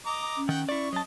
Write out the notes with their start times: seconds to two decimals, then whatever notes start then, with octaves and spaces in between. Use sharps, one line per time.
0.06 D#5 A#5 D6
0.37 C#4
0.49 D#3 F#5 G5
0.69 E4 D5 C#6
0.93 F#3 D#5 A5